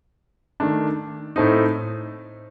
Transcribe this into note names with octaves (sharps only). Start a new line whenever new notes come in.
D#3 A3 D4
A2 A3 C4 D#4